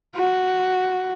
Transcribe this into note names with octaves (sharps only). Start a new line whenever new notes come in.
F#4